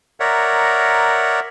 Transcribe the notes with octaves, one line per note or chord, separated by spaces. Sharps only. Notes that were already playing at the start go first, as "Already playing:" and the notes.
A#4 C#5 D5 E5 F#5 A#5